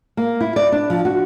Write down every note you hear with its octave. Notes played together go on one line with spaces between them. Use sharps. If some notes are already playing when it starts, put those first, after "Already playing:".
A#3
E4
D5
D4
F3
F#4